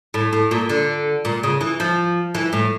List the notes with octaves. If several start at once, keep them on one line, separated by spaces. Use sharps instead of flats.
A2
A2
A#2
D3
A#2
C#3
E3
F3
E3
A2